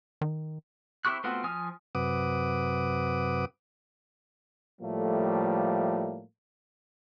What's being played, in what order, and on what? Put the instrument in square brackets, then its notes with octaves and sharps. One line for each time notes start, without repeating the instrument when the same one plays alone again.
[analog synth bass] D#3
[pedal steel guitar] C4 E4 G4 C#6 F#6
A3 B3 C4 F4 F#4
F3 G#5 D#6 F6
[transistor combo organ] F#2 C3 B4 F#5 D6 D#6
[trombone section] A2 F3 G3 A3 A#3